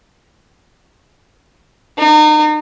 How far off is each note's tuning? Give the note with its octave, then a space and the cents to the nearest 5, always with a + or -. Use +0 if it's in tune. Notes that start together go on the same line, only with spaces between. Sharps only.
D#4 -35